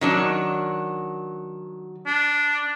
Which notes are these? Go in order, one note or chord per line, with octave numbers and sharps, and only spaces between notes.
D#3 F#3 D4
D4